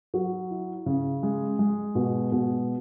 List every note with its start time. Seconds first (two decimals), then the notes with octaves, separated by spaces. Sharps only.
0.14 F#3
0.51 E4
0.86 C#3
1.23 G#3
1.59 G#3
1.95 B2
2.32 B2